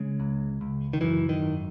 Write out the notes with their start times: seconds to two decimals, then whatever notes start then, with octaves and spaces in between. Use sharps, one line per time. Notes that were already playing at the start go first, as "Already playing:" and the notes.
Already playing: C#3 G#3
0.20 C#2
0.61 C#2
0.93 D#3
1.01 F#2 E3
1.29 D#3
1.42 G#1